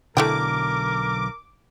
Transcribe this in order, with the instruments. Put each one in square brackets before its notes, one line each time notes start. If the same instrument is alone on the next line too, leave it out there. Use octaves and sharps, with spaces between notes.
[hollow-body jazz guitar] B1 D3 [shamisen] A3 E4 G5 [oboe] A#4 [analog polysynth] D6